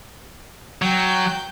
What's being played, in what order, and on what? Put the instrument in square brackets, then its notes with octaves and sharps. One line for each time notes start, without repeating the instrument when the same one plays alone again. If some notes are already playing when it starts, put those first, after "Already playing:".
[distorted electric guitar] F#3 [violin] G5 G6